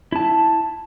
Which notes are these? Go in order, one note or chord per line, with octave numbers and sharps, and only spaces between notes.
E4 A5